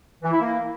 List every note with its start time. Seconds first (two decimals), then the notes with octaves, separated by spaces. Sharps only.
0.23 E3
0.31 E4
0.40 A#3